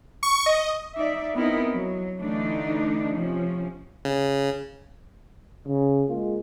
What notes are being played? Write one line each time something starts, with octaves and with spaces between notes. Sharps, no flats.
C#6
D#5
D#4 D5 E5
B3 C4 D#4 E4 A#4
F#3
D3 E3 A3 D4 D#4
C3 F3 C#4
C#3
C#3
G#3 A#3 F4